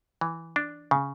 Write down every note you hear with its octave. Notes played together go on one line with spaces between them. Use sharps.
E3
D4
C#3